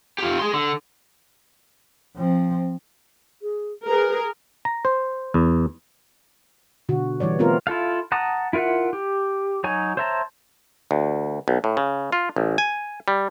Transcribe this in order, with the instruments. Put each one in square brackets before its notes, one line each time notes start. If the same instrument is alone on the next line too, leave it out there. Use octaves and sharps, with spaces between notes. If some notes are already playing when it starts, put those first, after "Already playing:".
[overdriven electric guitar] F4 G4
G#4 C6
D3
[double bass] F3 C4
[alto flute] G#4
[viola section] G#4 A#4 [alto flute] B4
[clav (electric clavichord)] A#5
C5
E2
[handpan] B2 D3 F#4
E3 G3 C#5 D5
A3 B3 C4 F4 A#4
[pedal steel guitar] E4 F4 A4 F5
F#5 A5 A#5 D#6
E4 F4 A#4 E5 F#5
G4
F#3 D#4 C#5 G#5
C5 C#5 E5 A5 A#5
[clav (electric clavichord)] D2
B1
A2
C#3
F4
A1
G#5
G3